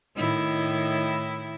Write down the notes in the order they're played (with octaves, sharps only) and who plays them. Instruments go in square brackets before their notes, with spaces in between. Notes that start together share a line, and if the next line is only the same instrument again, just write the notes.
[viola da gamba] A2 D#3 E4